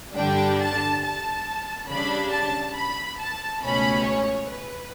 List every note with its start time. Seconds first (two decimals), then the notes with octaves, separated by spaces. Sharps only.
0.15 G2 D3 G3 D4 G5
0.59 A5
1.02 A5
1.88 C#3 G3 D4 B5
2.32 A5
2.76 B5
3.19 A5
3.62 C#2 B2 A3 C#4 B5
4.05 C#5
4.49 B4